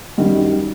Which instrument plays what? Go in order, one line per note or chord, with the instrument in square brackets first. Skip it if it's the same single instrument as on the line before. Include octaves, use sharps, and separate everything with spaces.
[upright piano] F#2 D#3 G3